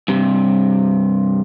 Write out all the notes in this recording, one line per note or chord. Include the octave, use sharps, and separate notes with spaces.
G2 C3